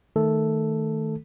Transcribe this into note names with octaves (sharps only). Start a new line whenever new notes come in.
D#3 A3 A4